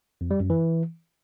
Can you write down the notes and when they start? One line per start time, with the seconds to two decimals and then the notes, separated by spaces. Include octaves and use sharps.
0.21 F2
0.31 G3
0.40 F#2
0.50 E3